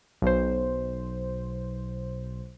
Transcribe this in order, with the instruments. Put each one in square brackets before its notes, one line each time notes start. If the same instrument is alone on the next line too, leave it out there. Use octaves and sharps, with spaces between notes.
[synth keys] B1 B2 C5